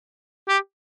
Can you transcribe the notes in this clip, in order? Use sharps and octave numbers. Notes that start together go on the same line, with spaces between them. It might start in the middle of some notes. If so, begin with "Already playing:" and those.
G4